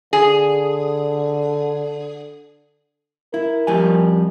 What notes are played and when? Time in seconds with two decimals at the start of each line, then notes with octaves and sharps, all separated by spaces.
0.13 D3 G#4
3.34 E4 A#4
3.67 F2 G3 G#5